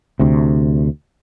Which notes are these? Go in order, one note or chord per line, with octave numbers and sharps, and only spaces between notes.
D2 C3